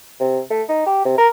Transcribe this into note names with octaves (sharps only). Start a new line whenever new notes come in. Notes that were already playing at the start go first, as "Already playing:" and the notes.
C3
A3
D#4
G4
C3
A#4